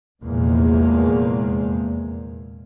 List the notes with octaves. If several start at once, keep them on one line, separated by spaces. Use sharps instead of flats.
F1 E2 A#2 F3 G#3 A#3